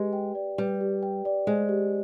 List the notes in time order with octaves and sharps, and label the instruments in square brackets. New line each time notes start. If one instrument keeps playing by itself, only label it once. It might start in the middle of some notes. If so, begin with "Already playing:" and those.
Already playing: [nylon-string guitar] G#3 [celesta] G4 B4
[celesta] G5
D5
[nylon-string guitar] G3 [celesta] B4
[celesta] G4
G5
D5
[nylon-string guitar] G#3 [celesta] C5
[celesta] G4